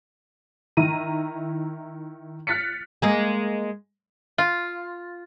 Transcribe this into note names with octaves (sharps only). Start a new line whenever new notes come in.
D#3 E4 A#5 D#7
F6 F#6 A6 B6 C#7
G#3 A#3 G#4
F4